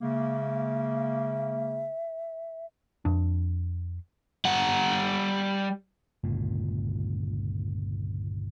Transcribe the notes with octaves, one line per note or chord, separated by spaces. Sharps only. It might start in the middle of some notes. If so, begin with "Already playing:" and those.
C#3 G#3 A#3 E5
F2 D4
G3 F#5
G1 C#2 A#2